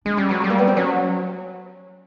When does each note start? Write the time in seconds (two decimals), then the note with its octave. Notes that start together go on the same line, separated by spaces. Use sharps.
0.05 G#3 D4
0.17 G3 C#4
0.29 F#3 B3
0.42 G3 A3
0.50 A#3
0.58 B3
0.67 C4
0.76 F#3 C#4